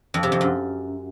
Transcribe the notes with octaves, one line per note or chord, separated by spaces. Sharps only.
F2
C3
F2
F#2